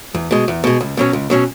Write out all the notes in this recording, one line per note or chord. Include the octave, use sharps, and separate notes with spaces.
E2
B2 G#3
E2
B2 G#3
C#2
B2 F#3 C#4
C#2
B2 F#3 C#4